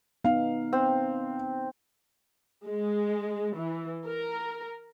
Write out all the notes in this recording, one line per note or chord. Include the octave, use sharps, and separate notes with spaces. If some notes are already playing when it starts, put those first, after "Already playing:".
B3 D#4 F5
C4
G#3
E3
A#4